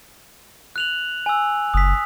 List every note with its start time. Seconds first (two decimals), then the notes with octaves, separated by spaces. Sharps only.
0.76 F#6 F7 F#7
1.26 G#5 E6
1.74 F#1 D#6 B6